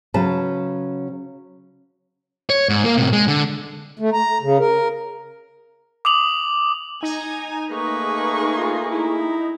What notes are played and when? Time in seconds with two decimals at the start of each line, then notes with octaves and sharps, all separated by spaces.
0.14 C#3 F#3 C#4 B4 A5
2.50 C#5
2.69 G#2
2.84 A#3 A#4
2.97 A2 C3
3.12 G#3
3.28 D3
3.99 A3
4.13 A#5
4.42 C#3
4.59 A#4
6.05 D6 D#6 F7 F#7
7.03 D#4 G#5 A#5
7.71 A3 A#3 G#4 B4 C#6
8.57 F4
8.91 E4